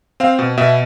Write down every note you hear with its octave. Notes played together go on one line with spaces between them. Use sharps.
C4 F5
B2
B2 E5